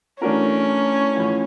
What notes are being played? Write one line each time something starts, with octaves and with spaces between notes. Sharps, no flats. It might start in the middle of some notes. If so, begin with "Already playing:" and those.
E3 A3 C#4 D4 F#4 A#4
A1 A2 F3